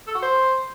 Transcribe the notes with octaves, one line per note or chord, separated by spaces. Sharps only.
A4
F#4
C5